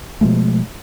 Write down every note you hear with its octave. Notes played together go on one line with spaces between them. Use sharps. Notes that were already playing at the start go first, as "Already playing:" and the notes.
B2 F3 G#3 A3